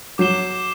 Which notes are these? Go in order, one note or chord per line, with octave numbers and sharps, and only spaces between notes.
F#3 D6 G6 C7 E7 G7